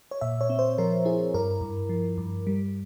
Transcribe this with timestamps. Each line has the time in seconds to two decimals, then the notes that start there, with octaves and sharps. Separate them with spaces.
0.11 C#5
0.21 A#2 E5
0.41 C#5
0.50 C4
0.59 C5
0.78 F3 A#4
1.05 E4 G#4
1.34 G2 A#4
1.61 G2
1.89 F3
2.18 G2
2.47 G3